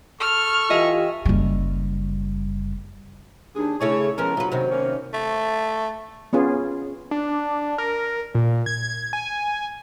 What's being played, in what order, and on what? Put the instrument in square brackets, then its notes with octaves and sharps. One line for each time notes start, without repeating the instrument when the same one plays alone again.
[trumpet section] A4 C#6 [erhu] F6
[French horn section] E3 F4 G4 [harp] D#5 E5 G#5
[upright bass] F#1 G3
[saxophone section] D#2 G#4 [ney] D4
[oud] C#3 A3 G#4 [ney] E4 [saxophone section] C#5
[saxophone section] C#3 G#3 A#4 [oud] F3 B3 C#4 [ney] A#5
[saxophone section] G2 B2 F#3 [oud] F4 B4
[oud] C3 D#3 F#4 [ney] C5
[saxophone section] A#3 C#4
[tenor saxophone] A3
[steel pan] B3 C#4 F4 G#4
[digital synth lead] D4
A#4
A#2
G#6
G#5